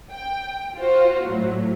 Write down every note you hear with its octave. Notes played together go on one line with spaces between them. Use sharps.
G5
F4 F#4 C5
A2 F#3